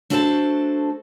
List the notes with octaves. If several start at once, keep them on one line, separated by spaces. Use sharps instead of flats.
A3 D4 F#4 A4 C5 A5